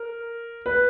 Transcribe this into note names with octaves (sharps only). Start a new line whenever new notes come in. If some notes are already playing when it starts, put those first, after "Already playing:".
Already playing: A#4
B4